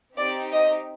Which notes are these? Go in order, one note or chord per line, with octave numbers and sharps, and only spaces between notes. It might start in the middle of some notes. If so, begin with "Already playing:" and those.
C4 D#4 G4 D5
D#5